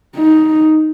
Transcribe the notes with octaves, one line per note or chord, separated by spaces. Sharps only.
D#4